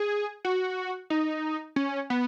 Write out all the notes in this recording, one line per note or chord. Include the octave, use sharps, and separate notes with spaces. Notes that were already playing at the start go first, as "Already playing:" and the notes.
Already playing: G#4
F#4
D#4
C#4
B3